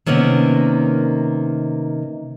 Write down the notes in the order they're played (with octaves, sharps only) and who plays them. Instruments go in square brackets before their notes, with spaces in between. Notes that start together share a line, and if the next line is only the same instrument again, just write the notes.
[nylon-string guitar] C3 D#3 A#3 B3 C#4